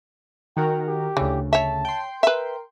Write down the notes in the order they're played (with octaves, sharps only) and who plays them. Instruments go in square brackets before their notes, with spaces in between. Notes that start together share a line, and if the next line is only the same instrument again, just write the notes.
[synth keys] D#3 F#4 A#4 [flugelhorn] G5
[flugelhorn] G4
[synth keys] D2 C#3 [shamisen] E3
[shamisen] C#5 E5 [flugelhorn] A5
[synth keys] G5 C6
[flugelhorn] A#4 [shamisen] B4 E5